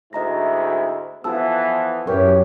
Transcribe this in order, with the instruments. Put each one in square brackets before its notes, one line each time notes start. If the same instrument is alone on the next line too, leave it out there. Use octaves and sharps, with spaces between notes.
[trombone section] D2 G#2 E4 [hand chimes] D#5 A#5 A#6
[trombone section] E3 F3 B3 [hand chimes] F4 A5 E6 [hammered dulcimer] A4
[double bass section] F#2 [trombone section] E3 G4 [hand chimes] A#4 B4 [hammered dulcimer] C#5